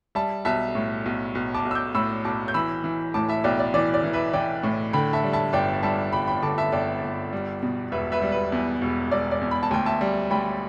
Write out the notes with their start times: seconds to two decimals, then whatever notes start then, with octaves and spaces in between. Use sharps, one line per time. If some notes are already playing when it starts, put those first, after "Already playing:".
0.15 G3 E5 A5
0.45 B1 E5 A5
0.75 A2
1.05 B1
1.35 B1
1.54 A5 D6
1.65 B1
1.71 E6
1.75 D6 G6
1.95 A2 B5 E6
2.25 B1 A5 D6
2.48 G6
2.54 E3 B5 E6
2.84 E3
3.14 A2 A5 D6
3.29 E5 A5
3.44 B1 D5 G5
3.59 D5
3.74 E3 D5
3.94 D5
4.04 E3
4.13 B4 E5
4.33 E3 D5 G5
4.63 A2
4.93 D3 G5 B5
5.13 E5 A5
5.24 G3
5.33 E5 A5
5.53 G1 D5 G5
5.83 G3 E5 A5
6.13 G1 G5 B5
6.28 G5 B5
6.42 D3 A5 D6
6.58 E5 A5
6.72 G1 D5 G5
7.02 G1
7.33 G3
7.63 B2
7.92 E1 B4 E5
8.12 B4 E5
8.22 G3
8.32 B4
8.52 E2
8.82 E1
9.11 E1 D5
9.31 D5
9.41 E2
9.51 B5
9.63 A5
9.71 D2 G5
9.86 E5 A5
10.01 G3
10.31 D2 G5 B5